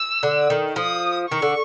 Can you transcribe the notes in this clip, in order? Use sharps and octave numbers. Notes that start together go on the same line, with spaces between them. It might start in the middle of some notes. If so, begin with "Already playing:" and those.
Already playing: E6
D3
D#3
F3 D#6
D#3 C#6
D3